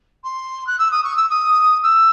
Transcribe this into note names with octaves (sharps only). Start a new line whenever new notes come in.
C6
F#6
E6
D#6
C#6
E6
D#6
E6